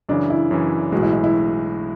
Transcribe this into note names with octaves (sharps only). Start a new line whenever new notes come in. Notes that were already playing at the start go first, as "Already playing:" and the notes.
F#2 C#3 E3 D4
E4
F#2 C#3 E3
B1 A2 E3 G#3 F#4
E4
E4
E4